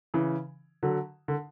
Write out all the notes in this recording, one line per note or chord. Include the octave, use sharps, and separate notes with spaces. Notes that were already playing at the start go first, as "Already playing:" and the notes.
C#3 E3
D3 F#3
D3